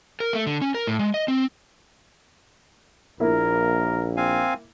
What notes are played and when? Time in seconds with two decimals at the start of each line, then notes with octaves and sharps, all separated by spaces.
0.20 A#4
0.33 A3
0.47 D3
0.62 C#4
0.75 A#4
0.87 A2
0.99 G#3
1.14 D#5
1.28 C4
3.20 A#1 A#3 E4 A#4
4.17 C4 F5 G#5